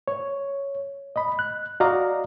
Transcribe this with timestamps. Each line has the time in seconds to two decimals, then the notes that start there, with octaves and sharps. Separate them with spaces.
0.08 C#5
1.16 D#5 B5
1.39 F#6
1.80 F#4 D5 D#5 F5 A#5